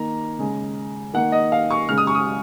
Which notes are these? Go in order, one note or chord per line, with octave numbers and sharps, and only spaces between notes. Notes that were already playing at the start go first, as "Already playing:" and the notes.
Already playing: D#3 A#3 A#5
C#3 G#3
D#3 A#3 F#5
D#5
F5
C#6
C#3 G#3 F6
D#6
C#6
D#6